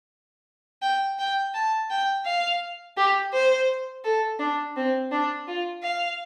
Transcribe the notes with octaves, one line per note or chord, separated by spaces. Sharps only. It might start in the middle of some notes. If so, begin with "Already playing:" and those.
G5
G5
A5
G5
F5
G4
C5
A4
D4
C4
D4
F4
F5